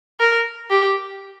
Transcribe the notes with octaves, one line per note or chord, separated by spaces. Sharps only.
A#4
G4